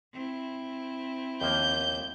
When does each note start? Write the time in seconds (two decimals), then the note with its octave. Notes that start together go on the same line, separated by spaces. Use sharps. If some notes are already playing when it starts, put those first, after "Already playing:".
0.14 C4 E4
1.41 D#2 F3 A#3 G6